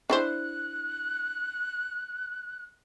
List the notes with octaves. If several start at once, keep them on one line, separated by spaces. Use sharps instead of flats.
D4 E4 C5 F#6